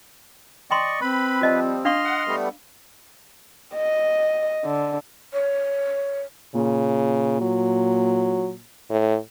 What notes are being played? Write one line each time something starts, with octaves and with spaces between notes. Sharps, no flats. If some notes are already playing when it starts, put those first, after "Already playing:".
D5 D#5 G5 A#5 C6 C#6
C4 B4 B5
F3 G3 F4 D#5 A5
D4 D#5 F5 C6 C#6 F6
F#5
G3 A3 B3
D#5
D3
C#5
A#2 C#3
F#3
A2